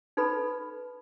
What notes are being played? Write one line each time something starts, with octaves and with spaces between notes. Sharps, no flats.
D#4 A4 B4 B5